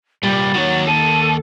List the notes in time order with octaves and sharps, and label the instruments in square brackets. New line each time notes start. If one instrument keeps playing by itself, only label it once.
[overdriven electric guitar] C2 A#2 [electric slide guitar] G3 [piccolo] A6
[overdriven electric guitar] D#2 D#3 [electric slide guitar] F#4 C#5
[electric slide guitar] A4 [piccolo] D#7